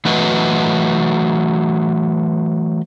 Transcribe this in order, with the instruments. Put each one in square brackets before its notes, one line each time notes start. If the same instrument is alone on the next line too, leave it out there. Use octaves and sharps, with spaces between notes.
[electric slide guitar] E3 F#3 A3 F#4 B4 D#5